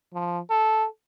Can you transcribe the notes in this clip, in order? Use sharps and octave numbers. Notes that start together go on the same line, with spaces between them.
F3
A4